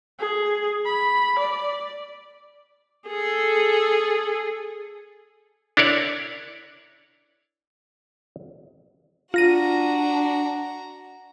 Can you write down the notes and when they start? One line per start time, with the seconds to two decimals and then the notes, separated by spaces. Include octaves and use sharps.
0.19 G#4
0.85 B5
1.39 D5
3.08 G#4 A4
5.77 D4 E4 A#4 C#5 D5
9.34 D4 F4 F#4 A#5 A#6 D#7